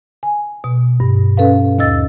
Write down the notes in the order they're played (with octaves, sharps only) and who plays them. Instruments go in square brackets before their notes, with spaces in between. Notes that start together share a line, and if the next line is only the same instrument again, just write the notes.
[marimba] G#5
B2
G2
C#4 A4 B4 F5
D#2 D#5 E6 A6